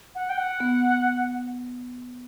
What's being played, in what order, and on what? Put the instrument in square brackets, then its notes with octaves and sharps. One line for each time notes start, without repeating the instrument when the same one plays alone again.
[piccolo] F#5
G5
F#5
[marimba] B3